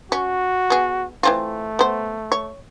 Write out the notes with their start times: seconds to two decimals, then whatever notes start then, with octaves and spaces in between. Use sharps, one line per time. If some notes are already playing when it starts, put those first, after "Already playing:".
0.12 C#4 F#4
0.70 B3 G#4
1.23 E3 A3 C4 F4
1.79 B3 C5
2.32 C#5